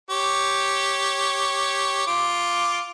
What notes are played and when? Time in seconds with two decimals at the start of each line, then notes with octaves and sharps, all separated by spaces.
0.10 G4 C#5
2.07 F4 D6